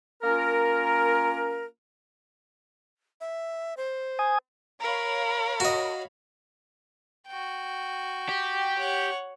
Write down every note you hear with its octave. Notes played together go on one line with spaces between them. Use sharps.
A#3 C#4 F4 A#4
E5
C5
G#5 D#6
A#4 C#5 F5 B5
F#4 D#5
F#4 G5
G4
C#5 F#5